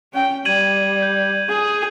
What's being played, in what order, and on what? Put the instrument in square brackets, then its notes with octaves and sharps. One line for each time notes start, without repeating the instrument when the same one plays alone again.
[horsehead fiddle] C#4 G5
[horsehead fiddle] G3 [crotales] G#6 D#7 F#7
[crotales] G6
[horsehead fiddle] G#4